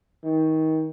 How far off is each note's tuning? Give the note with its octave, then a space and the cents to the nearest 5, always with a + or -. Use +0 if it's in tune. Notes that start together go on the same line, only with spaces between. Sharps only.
D#3 +25